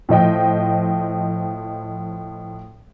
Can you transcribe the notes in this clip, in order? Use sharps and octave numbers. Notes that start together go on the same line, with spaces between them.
A2 F3 D#5 G5